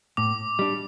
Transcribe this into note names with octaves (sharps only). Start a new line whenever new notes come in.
A2 D6
G3 D4